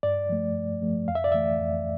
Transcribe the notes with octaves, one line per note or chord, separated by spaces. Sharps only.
G2 D5
F3 A3
G2
F3 A3
F2 F5
E5
D5
E3 A3 E5
F2